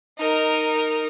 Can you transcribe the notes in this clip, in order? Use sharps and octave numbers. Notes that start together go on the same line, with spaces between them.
D#4 A#4